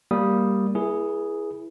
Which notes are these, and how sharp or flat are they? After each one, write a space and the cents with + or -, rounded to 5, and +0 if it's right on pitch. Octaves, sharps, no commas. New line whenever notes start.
G3 +0 A#3 -5 D#6 +0
E4 +0 G#4 +0 B4 -40